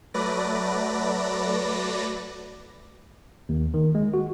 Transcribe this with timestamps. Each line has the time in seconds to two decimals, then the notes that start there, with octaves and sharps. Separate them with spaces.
0.14 F#3 A3 B4 D5 A#6
3.49 D#2
3.74 D#3
3.95 G#3
4.14 F#4